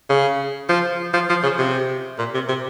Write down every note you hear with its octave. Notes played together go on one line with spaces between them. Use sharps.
C#3
F3
F3
F3
C#3
C3
A#2
C3
C3